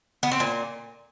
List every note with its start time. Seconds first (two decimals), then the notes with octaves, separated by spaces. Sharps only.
0.23 B3
0.32 C4
0.40 A#2